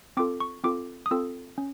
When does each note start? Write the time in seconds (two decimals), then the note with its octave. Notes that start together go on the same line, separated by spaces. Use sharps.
0.17 C4 F4 A4 D6
0.40 C#6
0.64 C4 F4 A4 D6
1.06 D#6
1.11 C4 F4 A4 E6
1.58 C#4